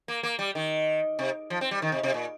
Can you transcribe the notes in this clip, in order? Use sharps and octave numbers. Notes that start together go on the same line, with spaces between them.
A#3
A#3
G3
D#3
C3
F3
C4
G3
D#3
C3
C3
A#2